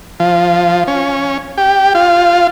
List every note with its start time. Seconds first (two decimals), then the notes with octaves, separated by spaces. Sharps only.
0.20 F3
0.87 C#4
1.58 G4
1.95 F4